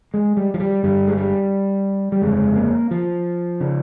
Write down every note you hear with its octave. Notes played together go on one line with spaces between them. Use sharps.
G#3
G3
F3
G3
G1 G2 G3
G#3
G3
G3
G1 F2 C#3 G#3
A#3
F3
C#3